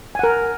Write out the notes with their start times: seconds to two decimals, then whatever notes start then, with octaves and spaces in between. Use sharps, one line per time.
0.15 G#5
0.19 F#5
0.23 A#4